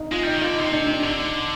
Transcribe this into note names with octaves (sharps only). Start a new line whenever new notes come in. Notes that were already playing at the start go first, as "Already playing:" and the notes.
Already playing: D#4
G#3 F4
G3 D#4
D#3
D3 F4
C3 D#4
D4
D4
D3 D#4